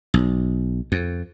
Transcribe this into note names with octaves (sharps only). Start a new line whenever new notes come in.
B1
F2